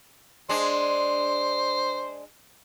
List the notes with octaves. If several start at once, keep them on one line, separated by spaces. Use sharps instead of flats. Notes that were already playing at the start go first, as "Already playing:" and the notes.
G#3 D4 C5